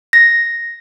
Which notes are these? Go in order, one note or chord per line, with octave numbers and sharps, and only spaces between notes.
A#6